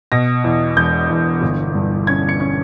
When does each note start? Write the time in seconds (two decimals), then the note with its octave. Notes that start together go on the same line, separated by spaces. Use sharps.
0.12 B2 A#6
0.44 E2
0.77 E1 G6
1.09 E2
1.42 G1
1.75 G2
2.07 C#4 G#6
2.29 C#7
2.40 C#4